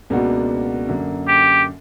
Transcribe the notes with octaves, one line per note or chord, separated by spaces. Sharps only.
C#2 B2 A#3 D4 F#4
F#2 D3 A#3
G4